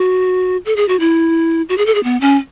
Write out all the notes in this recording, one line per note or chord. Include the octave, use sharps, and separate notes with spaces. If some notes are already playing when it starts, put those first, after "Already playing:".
Already playing: F#4
A4
G#4
F#4
E4
F#4
G#4
A4
G#4
B3
C#4